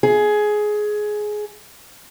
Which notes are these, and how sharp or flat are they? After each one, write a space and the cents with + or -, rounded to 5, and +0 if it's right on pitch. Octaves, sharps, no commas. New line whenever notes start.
G#4 +15